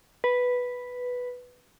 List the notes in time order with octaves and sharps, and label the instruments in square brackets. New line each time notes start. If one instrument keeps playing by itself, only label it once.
[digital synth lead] B4